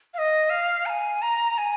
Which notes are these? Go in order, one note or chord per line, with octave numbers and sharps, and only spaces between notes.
F5
D#5
F5
A#5
G#5
A#5
G#5